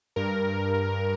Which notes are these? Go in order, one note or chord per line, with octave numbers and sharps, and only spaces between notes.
G2 A#4